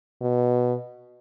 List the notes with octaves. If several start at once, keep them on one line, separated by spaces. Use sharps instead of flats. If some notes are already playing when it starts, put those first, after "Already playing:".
B2